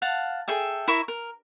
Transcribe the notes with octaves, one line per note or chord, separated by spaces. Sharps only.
F5 F#5 A5
G#4 A4 E5 G5
E4 A#4 E5 C#6
A#4